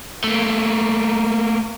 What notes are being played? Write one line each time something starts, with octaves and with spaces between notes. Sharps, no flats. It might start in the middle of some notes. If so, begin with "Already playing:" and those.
A3 A#3